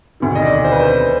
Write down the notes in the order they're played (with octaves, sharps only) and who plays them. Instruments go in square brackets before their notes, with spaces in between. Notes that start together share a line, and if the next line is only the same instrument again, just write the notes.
[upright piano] E1 D2 C3 D#3
[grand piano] D#5
D5
C5
B4
C5